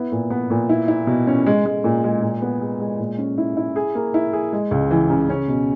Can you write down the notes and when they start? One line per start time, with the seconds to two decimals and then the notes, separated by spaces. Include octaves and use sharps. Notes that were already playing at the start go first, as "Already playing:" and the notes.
Already playing: B3 E4
0.12 A#2
0.30 B3
0.50 A#2
0.69 E4
0.88 E4
1.07 B2
1.27 C#4
1.46 G#3
1.66 G#3
1.84 A#2
2.04 G#3
2.22 A#2
2.42 B3
2.61 G#3
2.80 G#3
2.99 A#2
3.18 C#4
3.38 E4
3.57 E4
3.76 G#4
3.95 A#3
4.14 E4
4.33 G#4
4.53 G#3
4.71 C#2
4.91 E3
5.10 C#3
5.30 C#4
5.48 B2